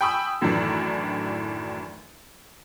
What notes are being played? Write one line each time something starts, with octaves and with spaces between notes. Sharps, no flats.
G5 G#5 B5 C#6 D#6 E6
F#2 A2 D#3 E3 D4